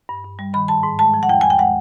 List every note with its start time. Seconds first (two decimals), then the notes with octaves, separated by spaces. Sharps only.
0.09 G2
0.24 G2
0.39 G3
0.54 D#3 B5
0.68 G#2 A5
0.83 G#2
0.99 G#3 A5
1.14 F3
1.23 F#5
1.29 E2 G5
1.41 E2 G#5
1.50 G5
1.59 G#3 F#5